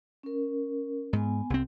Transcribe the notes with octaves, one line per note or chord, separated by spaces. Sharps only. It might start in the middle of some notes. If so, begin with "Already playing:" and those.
C#4 A#4
G#2 B3 G#5
C2 C4